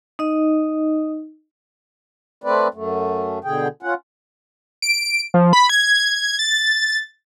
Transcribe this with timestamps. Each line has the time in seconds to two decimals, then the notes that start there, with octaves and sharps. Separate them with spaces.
0.19 D#4 D#5
2.44 A3 C4 B4 D5
2.74 F#2 A3
3.44 B2 D3 G#4 G5
3.83 C#4 F4 F#5
4.82 D7
5.34 F3
5.53 B5
5.69 G#6
6.39 A6